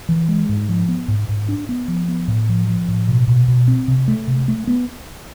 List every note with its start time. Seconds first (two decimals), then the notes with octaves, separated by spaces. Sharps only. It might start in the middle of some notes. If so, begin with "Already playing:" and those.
0.09 E3
0.28 G#3
0.49 G#2
0.69 F3
0.88 B3
1.08 G#2
1.29 G#2
1.48 D4
1.69 B3
1.88 F3
2.08 B3
2.28 A2
2.49 F3
2.68 F3
2.88 A2
3.08 B2
3.28 B2
3.48 B2
3.68 C4
3.88 C3
4.08 A3
4.27 C3
4.48 A3
4.67 B3